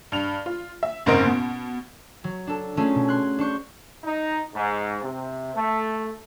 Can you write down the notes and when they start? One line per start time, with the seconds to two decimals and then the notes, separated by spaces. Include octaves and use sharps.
0.12 G2 F7
0.46 F4
0.83 E5
1.06 F#1 G#2 C4 A#4 D#5 D7
1.26 B2
2.24 F#3
2.47 D4 A4
2.77 F#3 A3 C#4 F4 G#4
2.95 B2
3.07 C6 F#6 G#6
3.38 D4 C5 C#6 G6
4.04 D#4
4.54 G#2
5.03 C3
5.55 A3